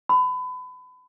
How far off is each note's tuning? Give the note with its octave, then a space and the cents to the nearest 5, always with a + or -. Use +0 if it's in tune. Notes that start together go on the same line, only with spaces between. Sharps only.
B5 +30